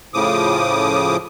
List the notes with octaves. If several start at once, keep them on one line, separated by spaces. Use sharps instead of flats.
A2 C#3 F3 D6 D#6